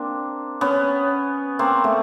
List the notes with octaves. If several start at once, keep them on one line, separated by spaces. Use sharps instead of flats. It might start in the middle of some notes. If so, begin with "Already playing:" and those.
Already playing: A#3 C4 D4
B3 C#4
A#3 C4
A3 B3